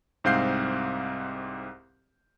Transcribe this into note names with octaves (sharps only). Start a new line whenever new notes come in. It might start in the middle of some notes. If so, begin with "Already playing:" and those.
C2 G#2 C4 F5 G6 C7